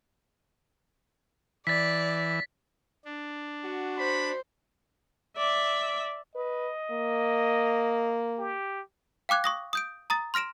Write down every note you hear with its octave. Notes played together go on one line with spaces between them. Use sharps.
E3 D5 A6 B6
D4
F#4
C5 B5
D5 E5
B4 D#5
A#3
G4
F5 G5 D6 F#6 G#6
C#6 D#6 A#6
D#6 G6 D7
A#5 D#6 A6
C6 F6 A#6 D7 E7